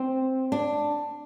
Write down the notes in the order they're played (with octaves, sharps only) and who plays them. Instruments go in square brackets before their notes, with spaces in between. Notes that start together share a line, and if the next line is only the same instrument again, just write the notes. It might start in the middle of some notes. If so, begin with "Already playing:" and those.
Already playing: [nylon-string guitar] C4
D4